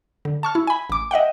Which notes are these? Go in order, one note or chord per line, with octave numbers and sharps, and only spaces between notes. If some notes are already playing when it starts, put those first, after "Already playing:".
D3
A5 C#6 F6
E4
G#5 B5
A1 D6
D#5 E5 F#5 G5